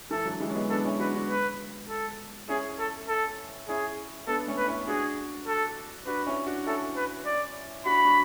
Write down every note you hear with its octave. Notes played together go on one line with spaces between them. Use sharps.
E3 A4
D3 F#3
E3 G#3
C#4
G#3 B3
B3 D4 A4
C#4 E4
D4 F#4 B4
D4 F#4
B4
A4
C#4 E4 G#4
A4
A4
C#4 E4 G#4
B3 D4 A4
A3 C#4
B4
C#4 E4
D4 F#4 G#4
A4
D4 F#4 B4
C#4 E4
D4 F#4
C#4 E4 A4
B4
D5
D4 F#4 B5
D4 F#4